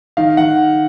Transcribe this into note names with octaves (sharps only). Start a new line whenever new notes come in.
D#3 F5
D#3 F#5